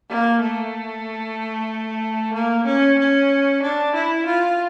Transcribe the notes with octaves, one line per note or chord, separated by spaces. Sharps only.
A#3
A3
A#3
C#4
C#4
D4
E4
F4